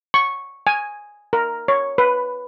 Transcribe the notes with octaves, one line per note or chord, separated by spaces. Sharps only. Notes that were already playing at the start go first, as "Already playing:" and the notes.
C#6
G#5
A#4
C#5
B4